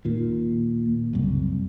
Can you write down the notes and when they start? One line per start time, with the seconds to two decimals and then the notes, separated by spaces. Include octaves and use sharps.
0.05 D#2 A#2
1.13 F#1 C2